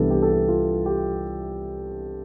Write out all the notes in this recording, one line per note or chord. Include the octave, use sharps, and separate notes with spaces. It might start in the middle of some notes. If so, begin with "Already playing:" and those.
Already playing: C2 C3 E3 B3 D4 A4
G4
A4
G4
F4
G4